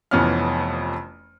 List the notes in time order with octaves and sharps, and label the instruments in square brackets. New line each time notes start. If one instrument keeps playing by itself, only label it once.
[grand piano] F1 F2 E3 B3 C#4 F6